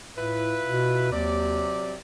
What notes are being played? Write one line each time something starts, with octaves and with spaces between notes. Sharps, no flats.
A2 E4 F4 B4
B2
D#2 C3 F#3 D5